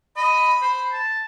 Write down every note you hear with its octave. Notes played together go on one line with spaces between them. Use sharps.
D#5 B5
C5
A5